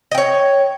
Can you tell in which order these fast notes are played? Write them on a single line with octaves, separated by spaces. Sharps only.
D#5 G5 C#5